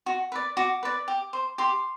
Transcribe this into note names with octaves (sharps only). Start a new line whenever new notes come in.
F#4
B4 D5
F#4 D6
B4 D5
G4
C5
G4 C6